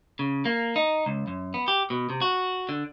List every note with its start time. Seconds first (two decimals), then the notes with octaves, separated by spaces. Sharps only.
0.19 C#3
0.45 A#3
0.76 D#4
1.06 C#2
1.28 F#2
1.54 B3
1.68 G4
1.90 B2
2.10 C3
2.21 F#4
2.69 D3